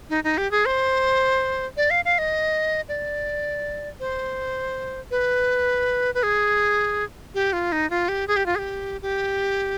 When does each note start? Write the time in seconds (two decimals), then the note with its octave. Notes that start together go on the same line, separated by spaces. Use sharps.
0.10 D#4
0.24 D#4
0.38 G4
0.51 G#4
0.66 C5
1.77 D5
1.90 F5
2.05 F5
2.18 D#5
2.89 D5
4.00 C5
5.11 B4
6.15 B4
6.23 G#4
7.35 G4
7.53 F4
7.72 D#4
7.90 F4
8.08 G4
8.28 G#4
8.36 G4
8.46 F4
8.55 G#4
8.59 G4
9.02 G4